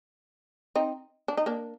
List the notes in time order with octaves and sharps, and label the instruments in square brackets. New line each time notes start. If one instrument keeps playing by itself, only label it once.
[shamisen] C4 D#4
D4
D#4
A#3 D4